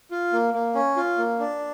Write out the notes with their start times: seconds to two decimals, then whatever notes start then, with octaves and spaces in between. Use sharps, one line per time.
0.11 F4
0.33 A#3
0.54 A#3
0.75 C#4
0.96 F4
1.18 A#3
1.39 D4